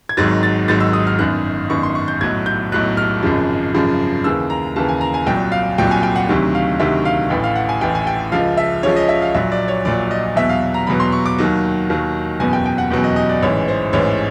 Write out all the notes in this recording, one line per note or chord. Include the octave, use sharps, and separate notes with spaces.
G#6
G#1 G#2 D#3 F#3 A6
A6
G#1 G#2 D#3 F#3 A6
E6
D#6
F6
G1 F#2 D#3 F#6
G1 F#2 D#3 C#6
C6
C#6
G6
B1 A2 F#3 G#6
G6
B1 A2 F#3 F#6
F6
G#1 F#2 C#3 F3
G#1 F#2 C#3 F3
D#2 C#3 E3 E6
A#5
D#2 C#3 E3 A5
G#5
A#5
G#5
C2 A#2 F#3 G5
F5
C2 A#2 F#3 G5
G#5
G5
F#5
D2 C3 D#3 F#3
F5
D2 C3 D#3 F#3 E5
F5
A1 A2 E3 G5
F5
F#5
G#5
A1 A2 E3 G5
G#5
G5
C#2 C#3 F3 F5
E5
C#2 C#3 F3 C#5
D#5
E5
F5
A#1 A#2 F#3 E5
D5
C#5
A#1 A#2 F#3 D5
D#5
E2 B2 F#3 E5
F5
A#5
E2 B2 F#3 B5
C6
C#6
D6
D#2 D#3 F#3
D#2 D#3 F#3
F#1 E2 B2 F#3 G#5
G5
G5
F#5
F#1 E2 B2 F#3
D#5
D#5
D5
A1 G#2 E3 C#5
C5
A1 G#2 E3 C#5